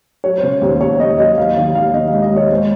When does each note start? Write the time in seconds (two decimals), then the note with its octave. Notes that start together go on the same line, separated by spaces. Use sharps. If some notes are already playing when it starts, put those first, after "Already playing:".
0.24 F#3 C#5
0.38 C5
0.43 C#3
0.61 D#2
0.67 C5
0.81 D#2 C#5
1.00 D#2 D#5
1.18 F#3 D#5
1.37 D#2 F5
1.56 D#3 F5
1.75 D#2 F5
1.94 D#3 D#5
2.08 G#3 F5
2.22 D#5
2.32 D#2 C#5
2.50 G#3 C5